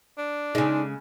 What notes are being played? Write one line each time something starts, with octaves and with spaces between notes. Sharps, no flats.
D4
C#3 G#3 D#4